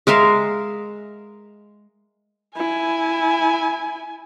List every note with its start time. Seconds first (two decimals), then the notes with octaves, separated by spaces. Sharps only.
0.07 G#3 A#4 E5 F5
2.57 E4 G#5